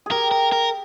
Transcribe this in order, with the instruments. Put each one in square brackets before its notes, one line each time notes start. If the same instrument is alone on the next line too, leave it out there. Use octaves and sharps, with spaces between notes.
[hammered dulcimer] G#4
[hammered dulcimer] G4 [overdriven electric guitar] A#4
[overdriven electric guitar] A#4
A#4